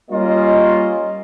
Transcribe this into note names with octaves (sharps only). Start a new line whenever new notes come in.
G3 A#3 C#4 F4 D#5